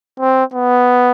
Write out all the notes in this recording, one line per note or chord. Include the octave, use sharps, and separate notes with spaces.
C4
B3